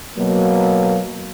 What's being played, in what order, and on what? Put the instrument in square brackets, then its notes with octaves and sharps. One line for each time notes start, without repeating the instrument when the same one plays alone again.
[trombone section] B2 F#3 A#3